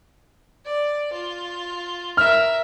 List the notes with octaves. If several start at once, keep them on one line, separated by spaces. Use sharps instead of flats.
D5
F4
A#4 E5 F6